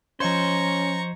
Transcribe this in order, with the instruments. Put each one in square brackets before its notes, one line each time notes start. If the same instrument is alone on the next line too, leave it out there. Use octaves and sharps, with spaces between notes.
[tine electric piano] F3 D#5 G#6 [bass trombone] C#4 [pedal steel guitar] C5 [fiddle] A#5 C#6